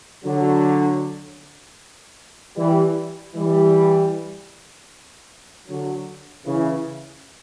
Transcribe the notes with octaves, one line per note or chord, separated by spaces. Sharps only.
D3 F#3
E3 G3
E3 G3
D3 F#3
C#3 E3